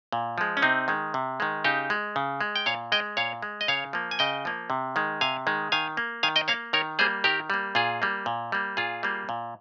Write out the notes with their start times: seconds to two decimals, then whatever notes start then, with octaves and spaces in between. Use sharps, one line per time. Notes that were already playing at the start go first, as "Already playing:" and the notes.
0.12 A#2
0.38 F3 G#3
0.57 C#4
0.62 C3 C4 D#4
0.88 D#3 G#3
1.14 C3
1.40 D#3 G#3
1.64 C#3 D#4 G4
1.90 G#3
2.16 C#3
2.41 G#3
2.56 G5
2.66 A#2 C#5 F5
2.92 G#3 D#5 G5
3.17 A#2 C#5 F5
3.43 G#3
3.61 D#5
3.68 C#3 C#5 F5
3.93 F3 A#3
4.11 G#5
4.19 C#3 D#5 G5
4.45 F3 A#3
4.70 C3
4.96 D#3 G#3
5.21 C3 F5 G#5
5.47 D#3 G#3
5.72 D#3 F5 G#5
5.97 A#3
6.23 D#3 F5 G#5
6.36 D#5 G5
6.48 A#3 C#5 F5
6.73 D#3 A#4 C#5
6.99 G3 A#3 G#4 C5
7.24 D#3 G4 A#4
7.50 G3 A#3
7.75 A#2 F4 G#4
8.02 G3 A#3
8.26 A#2
8.52 G3 A#3
8.77 A#2 F4 G#4
9.03 G3 A#3
9.29 A#2